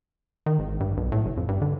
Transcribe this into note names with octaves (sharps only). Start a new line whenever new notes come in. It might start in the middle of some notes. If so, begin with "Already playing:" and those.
D#3
G#1
G2
B1
A2
G1
F2
G2
D3